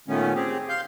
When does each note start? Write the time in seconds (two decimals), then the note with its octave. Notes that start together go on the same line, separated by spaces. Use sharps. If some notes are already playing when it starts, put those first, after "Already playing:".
0.08 A#2 D#3 A3 B3 C#4
0.35 C4 G4 G#4
0.69 F5 C6 G6